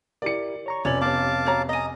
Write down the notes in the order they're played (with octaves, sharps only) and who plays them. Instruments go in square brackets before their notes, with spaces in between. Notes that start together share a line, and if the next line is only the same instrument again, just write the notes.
[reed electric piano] E4 G4 A#4 [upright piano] D5 C#7
[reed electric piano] C#5 A#5 C#6
[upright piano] F1 C#4 F#7 [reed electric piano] B2 G#5 D6 [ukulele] C#5 [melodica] D5
[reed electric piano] B3 [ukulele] G4 C#5 [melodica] F5 A5 D6
[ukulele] F#4 C#5 A#5
[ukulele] D#5 G#5 [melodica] A#5 D#6